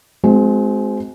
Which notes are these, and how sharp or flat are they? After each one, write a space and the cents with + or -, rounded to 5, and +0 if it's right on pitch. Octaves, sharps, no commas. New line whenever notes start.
G#3 +25 C4 -10 F#4 -15